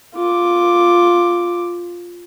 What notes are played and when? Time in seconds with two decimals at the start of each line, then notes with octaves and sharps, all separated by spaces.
0.15 F4 D6